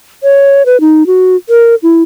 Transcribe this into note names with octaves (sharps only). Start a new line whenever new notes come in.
C#5
B4
D#4
F#4
A#4
E4